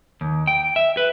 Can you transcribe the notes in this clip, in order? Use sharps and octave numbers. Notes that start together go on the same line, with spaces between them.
D#2
G5
E5
B4